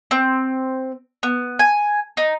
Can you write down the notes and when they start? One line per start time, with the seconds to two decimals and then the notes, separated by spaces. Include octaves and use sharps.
0.11 C4
1.23 B3
1.59 G#5
2.17 D#4